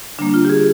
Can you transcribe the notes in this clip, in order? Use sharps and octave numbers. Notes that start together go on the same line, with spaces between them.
D3 G3 A#3 D4
F4
G4
G#4